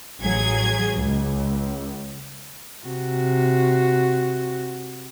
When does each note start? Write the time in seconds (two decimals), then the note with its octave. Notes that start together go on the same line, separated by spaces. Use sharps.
0.21 A1 F#3 G#4 G#6
0.96 C#2
2.86 C3 F#4